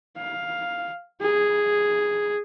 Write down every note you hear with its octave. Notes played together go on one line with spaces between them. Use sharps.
F5
G#4